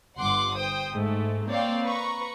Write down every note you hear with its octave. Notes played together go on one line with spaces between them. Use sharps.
G1 F#5 C6 D6
C5 G5 D#6
G#2 A3
A#3 C4 C#5 D5 F5 G5
B4 A#5 C#6